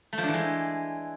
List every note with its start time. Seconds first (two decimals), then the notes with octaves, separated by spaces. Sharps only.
0.13 A3
0.18 F3
0.23 D4
0.28 E3
0.34 G#3